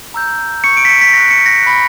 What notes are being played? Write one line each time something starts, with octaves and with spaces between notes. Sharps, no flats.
A#5 E6 G6
C#6 G6 C#7
D7
B6
C#7
B6
C#6 F#6 A#6
C#7
A#6
B5 F#6